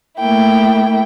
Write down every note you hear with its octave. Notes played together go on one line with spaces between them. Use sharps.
A3 A#3 E4 G5